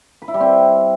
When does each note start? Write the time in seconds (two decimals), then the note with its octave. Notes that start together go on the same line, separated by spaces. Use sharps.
0.22 B4
0.28 E4
0.34 G3
0.40 C4